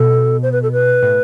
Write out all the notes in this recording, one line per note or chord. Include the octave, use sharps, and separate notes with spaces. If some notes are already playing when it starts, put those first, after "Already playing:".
Already playing: B2 A4
C5
B4
A4
B4
A2